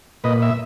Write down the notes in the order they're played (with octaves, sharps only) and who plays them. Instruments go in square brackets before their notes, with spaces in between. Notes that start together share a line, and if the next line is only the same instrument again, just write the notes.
[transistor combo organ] A#2 B4 D#5
E5